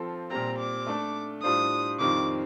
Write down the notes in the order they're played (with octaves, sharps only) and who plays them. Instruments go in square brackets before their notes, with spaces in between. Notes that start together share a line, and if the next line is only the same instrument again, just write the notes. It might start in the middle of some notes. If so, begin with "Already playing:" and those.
Already playing: [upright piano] F3 C4 F4 A4 C5
[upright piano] A#2 G3 C4 [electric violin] A#5
[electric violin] D6
[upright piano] A3 D4 A4
[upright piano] A2 G3 D4 F4 C5 [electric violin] D#6
[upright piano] F2 D#3 G3 C4 F4 [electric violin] D6